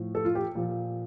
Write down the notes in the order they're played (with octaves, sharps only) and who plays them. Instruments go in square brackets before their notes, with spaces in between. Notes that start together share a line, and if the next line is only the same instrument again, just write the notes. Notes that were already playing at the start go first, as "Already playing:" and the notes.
Already playing: [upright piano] A2 F3
A4
F4
G4
A#2 F3